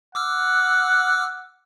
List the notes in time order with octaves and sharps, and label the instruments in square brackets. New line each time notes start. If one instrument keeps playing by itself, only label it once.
[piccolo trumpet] F#5 [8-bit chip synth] D6 E6 F6